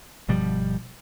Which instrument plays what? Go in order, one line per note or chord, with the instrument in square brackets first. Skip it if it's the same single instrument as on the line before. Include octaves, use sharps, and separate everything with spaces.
[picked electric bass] G1 B2 F3 G3